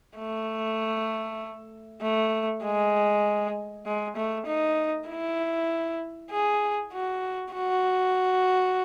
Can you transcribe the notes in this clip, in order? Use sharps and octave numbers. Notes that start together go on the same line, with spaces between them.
A3
A3
G#3
G#3
A3
D#4
E4
G#4
F#4
F#4